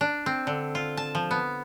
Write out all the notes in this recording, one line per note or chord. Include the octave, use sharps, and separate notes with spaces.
D4
C4
D3
F4
A5
F3
B3